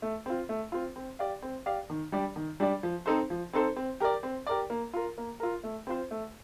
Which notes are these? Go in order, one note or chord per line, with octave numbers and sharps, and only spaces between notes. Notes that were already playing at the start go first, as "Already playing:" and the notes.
A3
C4 F4
A3
C4 F4
C4
G4 D5 F5
C4
G4 D5 F5
D#3
G3 D4 G4 D5
D#3
G3 D4 G4 D5
F3
C4 D#4 A4 C5
F3
C4 D#4 A4 C5
C4
G4 A#4 D5
C4
G4 A#4 D5
A#3
F4 A#4
A#3
F4 A#4
A3
C4 F4 C5
A3